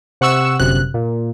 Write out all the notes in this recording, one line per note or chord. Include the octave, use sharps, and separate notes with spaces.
C3 F#5 C#6 E6 C#7 E7
G1 F#2 C3 F#6
A#2